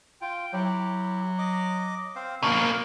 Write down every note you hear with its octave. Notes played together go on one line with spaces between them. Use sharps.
F4 G5
F#3 E4 G4
D#5 D6
C4 C5 F5
B2 A#3 A#4 F5